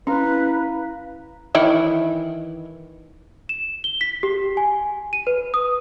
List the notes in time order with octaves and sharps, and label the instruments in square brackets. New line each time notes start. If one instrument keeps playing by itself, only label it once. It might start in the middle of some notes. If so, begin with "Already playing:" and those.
[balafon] C#4 [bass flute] E4 [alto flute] B4 [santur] F5 A#5
[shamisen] D#3 E3 E4
[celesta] E7
G7
B6
G4
G#5
D#7
B4
D#6